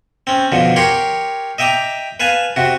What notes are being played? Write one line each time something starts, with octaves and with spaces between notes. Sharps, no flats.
C4 C#4
B2 D3 F3
G4 A#4 C#5 C6
D#5 E5 G5 A#5 D6
B4 F5 G#5 A5
C3 F#4